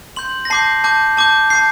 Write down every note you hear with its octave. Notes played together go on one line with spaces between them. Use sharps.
C6 G6 F#7
A#6
A5 D6 G6 C7
A5 D6 G6
A5 D6 G6
A5 D6 G6 C7